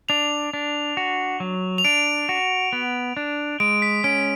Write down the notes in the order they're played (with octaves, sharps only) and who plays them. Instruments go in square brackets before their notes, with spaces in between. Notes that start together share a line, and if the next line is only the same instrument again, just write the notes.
[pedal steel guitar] D4 [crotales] F7
[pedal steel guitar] D4
F#4
F#3
[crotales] F7
[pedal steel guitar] D4 [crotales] D7
[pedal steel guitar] F#4
B3
D4
[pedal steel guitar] G#3 [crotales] D7
[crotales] B6
[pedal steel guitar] C#4 [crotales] D7